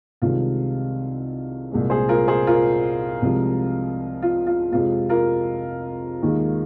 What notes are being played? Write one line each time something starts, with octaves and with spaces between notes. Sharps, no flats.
C2 C3 D#3 G#3 F4
C2 A#2 G#3
G#4 C5
F4 A#4
G#4 C5
F4 A#4
C2 C3 F3 G#3
F4
F4
F2 C3 G#3 F4
F4 A#4
D#2 D#3 G#3